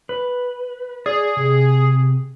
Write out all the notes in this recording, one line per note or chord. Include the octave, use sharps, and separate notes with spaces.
B4
G#4 D5
C3